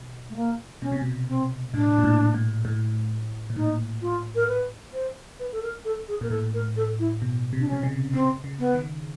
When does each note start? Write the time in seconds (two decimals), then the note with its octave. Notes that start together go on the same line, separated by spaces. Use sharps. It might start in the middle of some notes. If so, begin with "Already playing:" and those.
Already playing: B2
0.30 A3
0.36 A#3
0.82 B2 C#4
0.92 C3
1.01 B2
1.28 C4
1.73 A2 D4
1.98 A#2
2.04 A2
2.34 A2
2.65 A2
3.50 A#2
3.56 A2 D#4
4.01 F4
4.35 A#4
4.48 B4
4.93 C5
5.39 B4
5.52 A4
5.62 A#4
5.85 A4
6.08 G#4
6.21 A#2 A#4
6.30 A2 A4
6.54 A#4
6.77 A4
6.99 E4
7.22 B2
7.53 C3
7.60 D4
7.68 C3 C#4
7.83 C#3
8.13 C#3 C4
8.44 C#3
8.59 B3
8.75 D#3